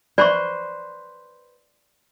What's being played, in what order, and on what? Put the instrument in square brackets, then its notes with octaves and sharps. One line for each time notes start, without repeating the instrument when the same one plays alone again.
[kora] B4 C5 [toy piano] D5 C6 C#6